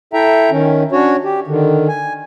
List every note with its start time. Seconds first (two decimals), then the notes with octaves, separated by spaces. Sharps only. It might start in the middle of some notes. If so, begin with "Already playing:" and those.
0.13 E4 A4 E5 G5 A#5
0.51 D#3 C#4
0.92 C#4 D4 F#4 C#5
1.24 G4
1.47 D3 D#3
1.88 G#5